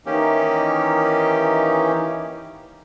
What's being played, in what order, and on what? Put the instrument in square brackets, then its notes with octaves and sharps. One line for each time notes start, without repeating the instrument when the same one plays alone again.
[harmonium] D#3 E3 D#4 [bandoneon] A#3 C#4 G4